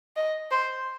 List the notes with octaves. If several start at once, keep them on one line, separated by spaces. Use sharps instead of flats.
D#5
C5